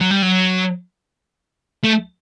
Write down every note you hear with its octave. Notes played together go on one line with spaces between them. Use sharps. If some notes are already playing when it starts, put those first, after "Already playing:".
F#3
G3
F#3
A3